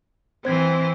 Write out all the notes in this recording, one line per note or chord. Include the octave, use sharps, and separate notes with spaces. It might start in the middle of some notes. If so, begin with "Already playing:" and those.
E3 C4 C5 G#6